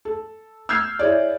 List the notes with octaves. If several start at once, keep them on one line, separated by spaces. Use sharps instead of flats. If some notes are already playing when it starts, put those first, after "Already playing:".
A4
E6 F6 G6 G#6 C7
E4 G#4 C#5 D5